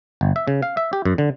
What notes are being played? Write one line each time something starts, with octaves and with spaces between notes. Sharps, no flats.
G1
E5
C#3
F5
E5
G4
F#2
D3